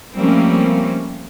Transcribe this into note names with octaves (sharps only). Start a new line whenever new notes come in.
F3 G3 A3 A#3 C4 C#4